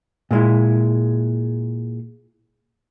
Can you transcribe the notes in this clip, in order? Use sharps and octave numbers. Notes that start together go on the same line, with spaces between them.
A#2 G#3 E4